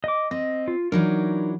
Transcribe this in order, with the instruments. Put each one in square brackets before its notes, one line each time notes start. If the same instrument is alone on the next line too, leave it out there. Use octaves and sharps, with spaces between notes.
[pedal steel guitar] D#5 D6
[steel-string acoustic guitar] C4 [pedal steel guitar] D#5
[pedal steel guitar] F4
[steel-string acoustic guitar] E3 F#3 D4 [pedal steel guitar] D#4 A#4